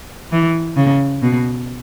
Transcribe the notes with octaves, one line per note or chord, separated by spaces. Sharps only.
E3
C#3
B2